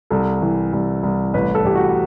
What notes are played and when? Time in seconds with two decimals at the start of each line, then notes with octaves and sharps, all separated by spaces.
0.10 C2 A4
0.42 E3
0.73 C2
1.03 C2
1.34 A1 B4
1.55 A4
1.64 A1 G4
1.75 F#4